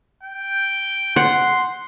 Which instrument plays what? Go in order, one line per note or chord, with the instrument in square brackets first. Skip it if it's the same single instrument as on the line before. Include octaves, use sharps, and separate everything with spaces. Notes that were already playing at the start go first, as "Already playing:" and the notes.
[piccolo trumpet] G5
[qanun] F#5 [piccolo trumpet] C6